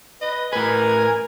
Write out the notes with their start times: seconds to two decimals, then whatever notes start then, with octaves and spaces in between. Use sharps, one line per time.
0.21 B4 D#5
0.53 A2 A#4 B4 G#5